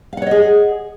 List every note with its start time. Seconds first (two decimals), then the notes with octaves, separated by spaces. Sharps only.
0.13 F5
0.17 F#5
0.22 C#5
0.27 D#5
0.31 G#4